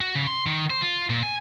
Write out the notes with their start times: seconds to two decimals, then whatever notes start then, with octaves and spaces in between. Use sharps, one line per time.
0.01 F#4
0.15 C#3
0.27 C6
0.47 D#3
0.70 C5
0.82 F4
1.10 A#2
1.23 G#5